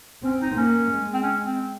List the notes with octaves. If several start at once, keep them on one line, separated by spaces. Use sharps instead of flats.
C4 C#4
D#4
A#3 C#4
G#3
C4
C#4
C4